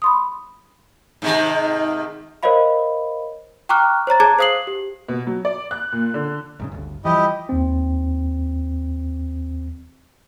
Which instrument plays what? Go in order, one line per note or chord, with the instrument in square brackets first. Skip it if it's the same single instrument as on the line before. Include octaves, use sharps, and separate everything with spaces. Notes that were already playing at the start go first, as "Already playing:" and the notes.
[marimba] B5 C6 D#6
[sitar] G#2 C3 D#3
[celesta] A#4 C5 C#5 D#5 F5 B5
G5 A#5 C#6 D6 F6 F#6
C5 C#5 A#5 A6
G#4 A5 A#5 D6 F#6 G#6
C5 F5 D#6 C7 F#7
G4
[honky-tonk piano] B2
F#3
D5
F#6
A#2
D3
[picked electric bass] C2 G#2 C#3
G1 D2
[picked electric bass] E3 F3 G3 [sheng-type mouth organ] E4 G4 D#5
[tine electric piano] D#2 C4